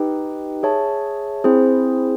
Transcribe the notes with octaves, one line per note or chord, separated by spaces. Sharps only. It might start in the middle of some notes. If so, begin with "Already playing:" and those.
Already playing: D#4 G4 B4 D#5 G5
G#4 C#5 E5 A5
C4 E4 G#4 C5